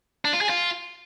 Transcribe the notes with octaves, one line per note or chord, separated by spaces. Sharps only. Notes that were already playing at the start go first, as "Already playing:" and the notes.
D4
F4
G#4
F4